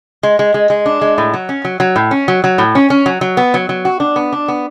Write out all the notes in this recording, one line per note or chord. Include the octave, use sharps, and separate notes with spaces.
G#3
G#3
G#3
G#3
D4
G#3
A2
F#3
C#4
F#3
F#3
A2
C#4
F#3
F#3
A2
C#4
C#4
F#3
F#3
B3
F#3
F#3
F#4
D4
B3
D4
B3